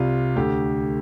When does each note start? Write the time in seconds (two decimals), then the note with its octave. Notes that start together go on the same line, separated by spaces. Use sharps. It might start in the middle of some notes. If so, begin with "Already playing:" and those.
Already playing: C2 C3 G3 F4
0.36 D2 D3 A3 G4